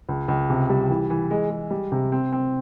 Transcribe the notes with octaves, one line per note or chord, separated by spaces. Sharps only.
C#2
C#2
C3
G3
E3
E3
G#3
G#3
G3
C3
C4
C4